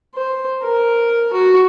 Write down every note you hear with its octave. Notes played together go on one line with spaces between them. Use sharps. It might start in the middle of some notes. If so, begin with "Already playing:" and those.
C5
A#4
F#4